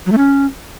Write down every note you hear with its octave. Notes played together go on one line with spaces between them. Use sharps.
F#3
A3
C#4